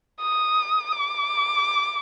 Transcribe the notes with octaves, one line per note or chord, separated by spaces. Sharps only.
D#6
D6